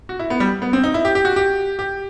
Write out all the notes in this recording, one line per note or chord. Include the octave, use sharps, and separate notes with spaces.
F#4
E4
B3
G3
B3
C4
D#4
E4
G4
G4
F#4
G4
G4